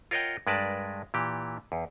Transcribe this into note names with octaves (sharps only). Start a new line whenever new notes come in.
F4 A#4 C#5 D#5 F#5 G5
G2 G#3 A#4 B4 D5 A5
A#2 E3 G4
E2